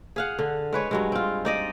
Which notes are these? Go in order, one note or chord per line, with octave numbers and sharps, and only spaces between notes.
G#4 F5 F#5
D3
G#3 B4 C#5
G2 F#3 G#3
C4 F4
D#4 D5 D#5